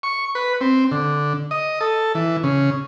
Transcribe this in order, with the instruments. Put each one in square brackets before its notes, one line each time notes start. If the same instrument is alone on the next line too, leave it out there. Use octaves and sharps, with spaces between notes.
[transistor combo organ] C#6
B4
C4
D3
D#5
A4
E3
C#3